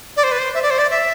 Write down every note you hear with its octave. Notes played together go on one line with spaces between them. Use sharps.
D5
C5
B4
C5
E5
D5
C5
D5
E5